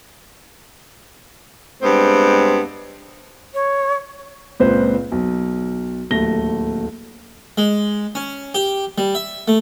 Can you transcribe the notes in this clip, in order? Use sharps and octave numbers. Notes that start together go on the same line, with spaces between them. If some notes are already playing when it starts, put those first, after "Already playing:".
G2 G#3 B3 C4
C#5
C#2 A#2 C4 B4 C5
B1
D1 D#2 A3 A#6 G7
G#3
C#4
G4
G3
E5
A3